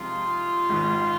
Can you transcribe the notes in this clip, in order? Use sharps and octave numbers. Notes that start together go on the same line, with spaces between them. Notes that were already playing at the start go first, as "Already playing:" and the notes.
Already playing: C3 F3 G#3 D#4 F4
G#1 G#2 D#3